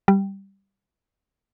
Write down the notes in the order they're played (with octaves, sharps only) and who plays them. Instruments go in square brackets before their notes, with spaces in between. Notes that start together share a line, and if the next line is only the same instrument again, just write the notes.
[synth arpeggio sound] G3